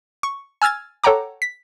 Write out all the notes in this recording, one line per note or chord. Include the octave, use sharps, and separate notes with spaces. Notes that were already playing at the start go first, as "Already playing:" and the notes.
C#6
G#5 E6 F6 G#6 A6
A4 C#5 F#5 G5 A#5 D6
B6